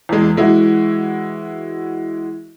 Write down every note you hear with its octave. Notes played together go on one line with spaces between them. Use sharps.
E2 G#3
E3 G#3 E4 F#4